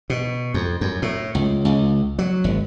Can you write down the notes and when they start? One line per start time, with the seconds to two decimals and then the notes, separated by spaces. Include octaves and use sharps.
0.10 B2
0.54 F2
0.81 F#2
1.02 A2
1.35 C#2
1.65 C#2
2.19 F#3
2.44 G#1